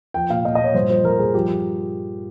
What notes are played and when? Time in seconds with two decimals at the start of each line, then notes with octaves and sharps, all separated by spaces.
0.14 F3 G5
0.29 A#2 F5
0.44 A#2 D#5
0.55 D#5
0.60 A#2 C#5
0.74 G2 C5
0.90 F3 C5
1.04 G2 A#4
1.19 G2 G#4
1.34 F3 G4